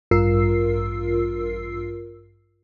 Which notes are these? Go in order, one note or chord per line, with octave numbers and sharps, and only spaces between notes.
A1 G2 F4 A#4 E6 C7